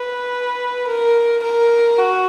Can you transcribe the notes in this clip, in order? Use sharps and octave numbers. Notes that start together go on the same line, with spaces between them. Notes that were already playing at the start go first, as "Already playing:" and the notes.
Already playing: B4
A#4
A#4
F#4